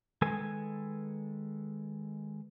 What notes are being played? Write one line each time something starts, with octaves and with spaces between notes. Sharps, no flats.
D#3 G#3 A4 B4 G#5